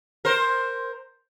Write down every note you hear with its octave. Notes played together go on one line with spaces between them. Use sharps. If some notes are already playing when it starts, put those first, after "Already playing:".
A#4 C5